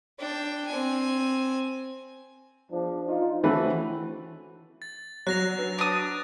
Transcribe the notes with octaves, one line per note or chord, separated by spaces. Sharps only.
D4 G5
C4 G#5
E2 F3 D4
D#4 F4
E3 A3 C4 C#4 F#4 B4
A6
F#3 F#6 A#6 F7
D4 B4
D4 B4 D#6